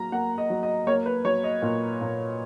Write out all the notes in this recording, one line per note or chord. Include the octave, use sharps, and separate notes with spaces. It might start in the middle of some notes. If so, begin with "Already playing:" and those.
Already playing: F#3 A#3 A#5
A#3 F#5
D#5
F#3
D#5
A#3 C#5
B4
F#3 C#5
D#5
A#2
A#2